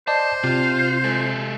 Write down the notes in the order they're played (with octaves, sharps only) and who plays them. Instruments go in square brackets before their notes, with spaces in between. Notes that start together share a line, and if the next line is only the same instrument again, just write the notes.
[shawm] C5 [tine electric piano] D5 D#5 [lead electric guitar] A5
[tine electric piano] C3 [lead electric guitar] F4
[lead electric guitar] G#3 A4